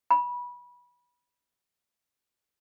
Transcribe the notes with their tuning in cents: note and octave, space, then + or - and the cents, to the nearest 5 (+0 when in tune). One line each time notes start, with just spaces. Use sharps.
B5 -20